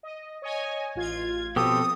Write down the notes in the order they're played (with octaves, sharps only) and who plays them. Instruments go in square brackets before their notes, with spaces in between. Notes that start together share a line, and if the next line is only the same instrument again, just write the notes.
[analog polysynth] D#5
C#5 D#5 G#5
A1 F4 G#6
[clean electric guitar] B2 G4 [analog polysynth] F3 C4 [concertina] A4 [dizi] D#6